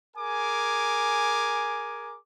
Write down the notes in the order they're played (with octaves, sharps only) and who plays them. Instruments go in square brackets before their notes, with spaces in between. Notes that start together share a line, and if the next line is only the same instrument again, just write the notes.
[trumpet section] G#4 A#4 G#5 D6